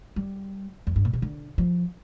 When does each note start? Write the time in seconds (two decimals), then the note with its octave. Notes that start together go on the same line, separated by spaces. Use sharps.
0.16 G3
0.87 F2
0.96 G2
1.05 A#2
1.13 C3
1.22 D3
1.58 F3